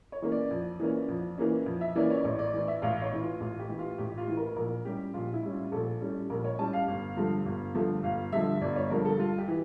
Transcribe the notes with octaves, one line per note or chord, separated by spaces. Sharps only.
C#5
E3 A#3 C#4
D5
F2
E3 A#3 C#4
F2
E3 A#3 C#4
F2
E5
E3 A#3 C#4 D5
C#5
D5
A1 C#5
D5
A2 E3 D5
E5
A1 F5
C#5
A2 E3
F4
A1 F4
G4
A2 E3
F4
A1 G4
F4
A2 E3
A#4
A#1 A#4
A2 G3 C#4 G4
A#1 F4
E4
A2 G3 C#4
F4
A#1 A4
A2 G3 C#4
A#1 A#4
C#5
A2 G3 C#4 A5
F5
G1
G2 D3 F3 A3
G1
G2 D3 F3 A3
G1 F5
G2 D3 F3 A3 E5
G1 D5
C#5
G2 D3 F3 A3 A#4
A4
G2 F4
G4
E3